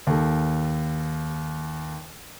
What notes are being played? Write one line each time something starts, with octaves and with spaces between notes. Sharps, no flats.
D#2 A4